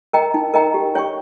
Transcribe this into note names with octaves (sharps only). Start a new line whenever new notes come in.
A#4 D#5 G5 A#5
D#4
A#4 D#5 G5 A#5
G4
C#5 G5 C#6